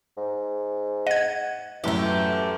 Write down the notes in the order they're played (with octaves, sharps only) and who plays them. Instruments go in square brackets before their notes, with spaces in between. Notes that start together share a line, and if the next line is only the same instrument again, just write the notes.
[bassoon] G#2
[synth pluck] D#5 G#6 [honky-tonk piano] F#5
[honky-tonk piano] F#2 A2 [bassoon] E3 [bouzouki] A3 G4